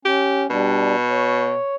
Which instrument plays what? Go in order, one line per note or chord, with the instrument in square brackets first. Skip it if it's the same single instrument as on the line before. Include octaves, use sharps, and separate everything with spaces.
[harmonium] C#4 [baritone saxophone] G4
[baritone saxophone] B2 [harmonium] G3 D4
[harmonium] C#5